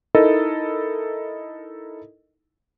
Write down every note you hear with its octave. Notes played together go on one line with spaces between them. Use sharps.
D#4 E4 A4 A#4 D#5